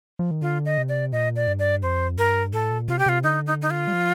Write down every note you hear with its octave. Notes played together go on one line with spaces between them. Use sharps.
F3
D#3
D3 F4
D#5
C3
D5
A#2 D#5
D5
G2
D5
F2 C5
G2 A#4
A2 A4
A#2
C3 F4
G4
C3 F4
D3 D#4
D#4
D#4
F4
G3
F3